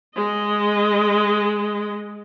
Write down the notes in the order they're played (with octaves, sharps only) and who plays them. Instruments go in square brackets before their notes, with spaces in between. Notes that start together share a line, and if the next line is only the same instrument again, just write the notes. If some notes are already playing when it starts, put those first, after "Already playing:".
[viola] G#3 D#5